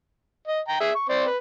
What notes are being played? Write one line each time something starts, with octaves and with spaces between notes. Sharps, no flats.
D#5
G5 A#5
G#4 E5
C#6
C4 C5 D5
B4